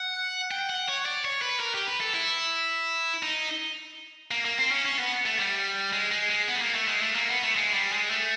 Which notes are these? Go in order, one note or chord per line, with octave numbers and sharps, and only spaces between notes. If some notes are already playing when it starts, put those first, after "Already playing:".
Already playing: F#5
G5
F#5
C#5
D5
C#5
B4
A#4
G4
B4
A4
E4
D#4
A#3
A#3
C4
C#4
C#4
B3
A3
G3
G#3
G#3
G#3
B3
A3
A#3
A3
G#3
A3
A#3
B3
A3
G#3
G3
G#3
A3